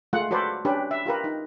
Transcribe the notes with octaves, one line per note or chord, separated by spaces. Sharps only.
G#3 A3 F4 F#5
F#4 A4 B4 C5 D5
C#4 D4 G4 B4
E5
F4 G4 A#4 B4
D#4